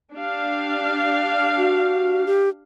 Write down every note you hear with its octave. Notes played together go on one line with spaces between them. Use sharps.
D4 G4 F5
F#4
G4